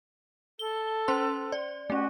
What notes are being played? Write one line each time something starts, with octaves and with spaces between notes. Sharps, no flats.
A4 G7
C#4 C5 C6
D5
A3 C#4 F#4